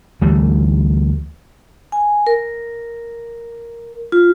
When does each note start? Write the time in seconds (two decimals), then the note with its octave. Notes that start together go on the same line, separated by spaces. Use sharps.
0.21 D2 E3 G3 A3
1.92 G#5
2.27 A#4
4.12 F4